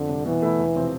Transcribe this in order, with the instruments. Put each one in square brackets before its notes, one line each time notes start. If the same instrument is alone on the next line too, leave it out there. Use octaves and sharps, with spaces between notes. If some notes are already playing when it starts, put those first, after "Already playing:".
Already playing: [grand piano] F2 [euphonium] D3
[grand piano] C3 G3
[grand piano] B2 [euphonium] E3
[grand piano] A3 E4
E1
C3 F3 C4